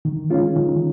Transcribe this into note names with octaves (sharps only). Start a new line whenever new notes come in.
D#3
G#3 C#4 F4
D#3